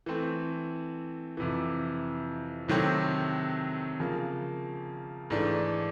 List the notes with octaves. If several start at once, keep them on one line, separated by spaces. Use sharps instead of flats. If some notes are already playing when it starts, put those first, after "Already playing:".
E3 A3 C4
F2 C3 E3
C3 D#3 F#3 A3 C4
C#3 F3 A#3
G#2 E3 A3 D4